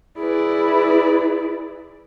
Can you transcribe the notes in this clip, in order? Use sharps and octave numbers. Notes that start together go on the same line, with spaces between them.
E4 G#4 B4 D5